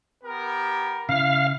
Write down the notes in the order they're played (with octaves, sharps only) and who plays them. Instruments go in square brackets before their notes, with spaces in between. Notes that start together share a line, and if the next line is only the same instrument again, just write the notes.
[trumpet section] B3 G4 A#4
[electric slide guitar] C#3 E4 [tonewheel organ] F5